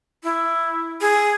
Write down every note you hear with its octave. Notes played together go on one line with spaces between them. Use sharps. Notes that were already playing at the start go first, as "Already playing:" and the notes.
E4
G#4